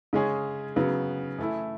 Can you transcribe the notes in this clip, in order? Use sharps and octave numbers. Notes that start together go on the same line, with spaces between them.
C#3 G#3 C#4 G#4
C#3 F#3 B3
E3 A3 E4